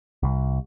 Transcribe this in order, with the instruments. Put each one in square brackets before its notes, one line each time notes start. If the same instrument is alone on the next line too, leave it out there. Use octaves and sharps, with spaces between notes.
[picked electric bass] C2